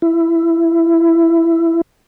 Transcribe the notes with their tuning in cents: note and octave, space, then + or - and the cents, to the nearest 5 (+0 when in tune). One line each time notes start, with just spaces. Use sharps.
E4 +15